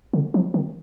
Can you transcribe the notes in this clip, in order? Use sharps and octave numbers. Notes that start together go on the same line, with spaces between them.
D3
F3
D#3